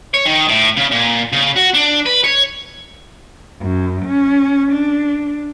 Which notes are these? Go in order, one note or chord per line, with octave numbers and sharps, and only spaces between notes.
C#5
D#3
A2
C#3
A#2
C#3
F#4
D4
B4
C#5
F#2
C#4
D4